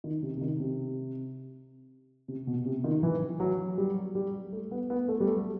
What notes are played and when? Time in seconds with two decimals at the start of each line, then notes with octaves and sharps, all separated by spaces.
0.04 D#3
0.23 C3
0.37 C3
0.41 D#3
0.60 C3
2.28 C3
2.47 B2
2.65 C3
2.84 D#3
3.03 E3
3.40 F#3
3.78 G3
4.15 G3
4.52 A3
4.71 B3
4.90 B3
5.08 A3
5.20 G3
5.27 A3